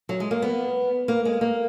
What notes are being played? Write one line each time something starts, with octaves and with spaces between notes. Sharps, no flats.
F#3
G#3
A#3
B3
A#3
G#3
A#3